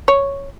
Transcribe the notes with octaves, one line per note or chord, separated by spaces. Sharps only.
C#5